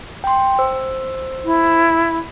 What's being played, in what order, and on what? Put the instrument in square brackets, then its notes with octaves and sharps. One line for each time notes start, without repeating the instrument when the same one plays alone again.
[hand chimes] G5 C6
C5 E6
[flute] E4